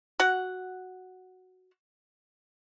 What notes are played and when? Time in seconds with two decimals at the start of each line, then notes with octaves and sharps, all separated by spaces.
0.20 F#4 F#5